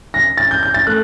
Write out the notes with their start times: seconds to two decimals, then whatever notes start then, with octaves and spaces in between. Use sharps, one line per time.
0.14 A#6
0.38 A6
0.51 G6
0.63 G6
0.74 A6
0.87 A3 F#6